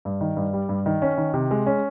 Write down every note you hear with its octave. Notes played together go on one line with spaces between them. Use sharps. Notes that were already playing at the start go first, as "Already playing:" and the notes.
G2
D#3
G2
G3
G2
D#3
C#4
D#3
C3
G#3
C#4